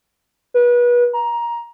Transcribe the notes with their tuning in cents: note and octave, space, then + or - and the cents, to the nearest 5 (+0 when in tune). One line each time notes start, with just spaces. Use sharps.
B4 -30
A#5 +15